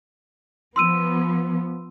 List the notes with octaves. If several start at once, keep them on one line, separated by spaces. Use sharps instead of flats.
F3 B3 C6 E6 D#7